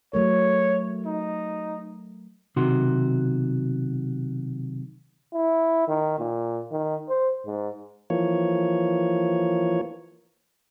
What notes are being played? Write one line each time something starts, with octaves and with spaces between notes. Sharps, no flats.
F#3 A3 A#4 C#5
D#4
B1 C3 D#3 F#4 C6
E4
D#3
A#2
D#3
C5
G#2
E3 F3 A#3 C#5